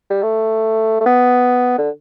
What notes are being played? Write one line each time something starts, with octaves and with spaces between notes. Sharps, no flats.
G3
A3
A3
B3
D3